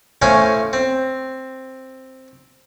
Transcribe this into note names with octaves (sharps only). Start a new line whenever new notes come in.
A2 C#4 C5 F5 G#5 B5
C4